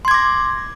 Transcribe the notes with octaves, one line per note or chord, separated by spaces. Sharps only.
C6 D6 G#6 A#6